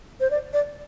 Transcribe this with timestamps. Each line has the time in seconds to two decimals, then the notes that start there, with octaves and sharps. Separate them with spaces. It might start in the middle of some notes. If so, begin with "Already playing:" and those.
0.20 C5
0.31 D5
0.53 D5